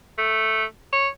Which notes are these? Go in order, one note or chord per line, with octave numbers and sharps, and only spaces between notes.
A3
C#5